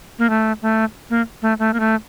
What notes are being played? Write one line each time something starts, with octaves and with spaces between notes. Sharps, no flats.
A#3
A3
A3
A#3
A3
A3
A#3
A3